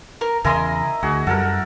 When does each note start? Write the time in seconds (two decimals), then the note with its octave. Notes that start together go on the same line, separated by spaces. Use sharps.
0.21 A#4
0.45 E2 C#3 E4 A#4 D#5 G#5 C6
1.03 D2 F#4 G#4
1.27 F#2 G3 A4 A#4 F#5